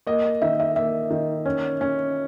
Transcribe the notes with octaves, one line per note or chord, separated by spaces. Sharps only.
A#3 D#5
D#3 E5
E5
A#3 E5
D#3
C#4
C#4